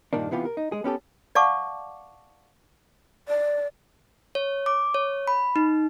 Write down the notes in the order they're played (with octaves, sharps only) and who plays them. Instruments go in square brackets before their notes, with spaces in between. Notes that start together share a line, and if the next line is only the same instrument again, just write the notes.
[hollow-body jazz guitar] G2 A#2 D#3 A#3 D4
C3 E3 B3 F4 G4
A#4
D#4
G#3 G#4
B3 C#4 G4 A4
[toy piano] D5 F5 F#5 A5 C#6 D6
[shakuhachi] D5
[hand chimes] C#5
D6
C#5
B5
D#4